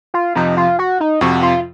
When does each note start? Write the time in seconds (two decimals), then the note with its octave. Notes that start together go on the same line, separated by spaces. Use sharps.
0.14 F4
0.35 F2 C3 F3 D#4
0.57 F4
0.79 F#4
1.00 D#4
1.21 F2 C3 F3 F#4
1.42 F4